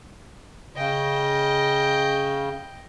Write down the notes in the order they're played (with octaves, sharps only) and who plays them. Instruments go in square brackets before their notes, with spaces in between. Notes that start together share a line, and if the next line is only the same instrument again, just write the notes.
[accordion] C#3 [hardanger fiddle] D#5 G5